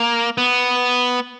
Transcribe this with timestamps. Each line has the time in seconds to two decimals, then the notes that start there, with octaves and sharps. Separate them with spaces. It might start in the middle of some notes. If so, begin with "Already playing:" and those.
Already playing: A#3
0.38 B3